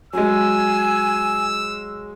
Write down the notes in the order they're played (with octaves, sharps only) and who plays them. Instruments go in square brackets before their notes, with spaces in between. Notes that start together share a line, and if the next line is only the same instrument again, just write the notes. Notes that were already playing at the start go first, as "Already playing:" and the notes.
[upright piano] F#3 G#3 [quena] G#5 [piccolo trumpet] E6